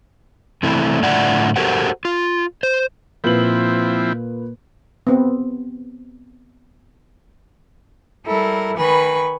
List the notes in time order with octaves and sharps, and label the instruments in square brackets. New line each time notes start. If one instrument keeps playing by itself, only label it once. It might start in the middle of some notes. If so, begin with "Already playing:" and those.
[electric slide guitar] C3 E3 A3 C4 E4
A2 D3 F4 D5 E5 F#5
F#4 G4 A4 A#4 C5 F#5
F4
C5
[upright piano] A#2 B4 F#7 [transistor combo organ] F3 C4 E4
[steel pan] B3 C4
[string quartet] G3 E4 A4 A#4
D#3 B4 G#5 B5 C#6